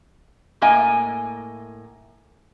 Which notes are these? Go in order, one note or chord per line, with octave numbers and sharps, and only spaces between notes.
A2 A#3 D#5 G#5